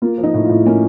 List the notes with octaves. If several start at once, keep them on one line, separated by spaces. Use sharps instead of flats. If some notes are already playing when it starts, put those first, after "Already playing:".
A#3 F4
F3
D#4
A2
F4
A2
A#3 C#4